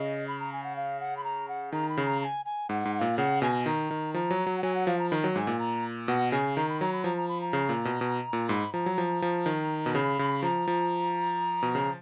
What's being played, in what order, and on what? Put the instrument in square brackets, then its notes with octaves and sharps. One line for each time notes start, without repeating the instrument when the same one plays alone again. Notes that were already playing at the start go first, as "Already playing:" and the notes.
Already playing: [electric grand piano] C#3 [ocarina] D#5
[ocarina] B5
A#5
G#5
F#5
F5
F#5
B5
A#5
F#5
[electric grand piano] D#3 [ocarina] A#5
[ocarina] B5
[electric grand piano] C#3
[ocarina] A#5
A#5
G#5
G#5
[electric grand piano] G#2 [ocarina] F#5
[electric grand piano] G#2
[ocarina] F#5
[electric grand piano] A#2 [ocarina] F5
[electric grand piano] C#3 [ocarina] F#5
[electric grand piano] B2 [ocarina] G#5
[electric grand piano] D#3 [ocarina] A#5
[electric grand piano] D#3
[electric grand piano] F3 [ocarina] A#5
[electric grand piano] F#3
F#3
[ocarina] F#5
[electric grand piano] F#3 [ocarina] G#5
[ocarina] F#5
[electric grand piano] F3 [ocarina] F5
[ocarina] A#5
[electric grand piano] D#3 [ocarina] A#5 B5
[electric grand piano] F#3
[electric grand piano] G#2 [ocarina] G#5
[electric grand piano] A#2
[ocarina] A#5
[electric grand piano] B2 [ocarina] F#5
[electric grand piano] C#3 [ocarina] G#5
[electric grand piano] D#3 [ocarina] A#5
[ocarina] B5
[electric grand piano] F#3 [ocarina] A#5
[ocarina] B5
[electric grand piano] F3 [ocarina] A#5
[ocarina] A#5
B5
A#5
[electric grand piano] C#3
A#2
B2
B2
A#2
[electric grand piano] G#2 [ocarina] B5
[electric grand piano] F3 [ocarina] A#5
[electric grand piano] F#3
F3
F3
D#3
B2
[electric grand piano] C#3 [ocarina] B5
[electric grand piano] C#3
[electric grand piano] F3 [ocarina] A#5
[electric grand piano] F3
B2
C#3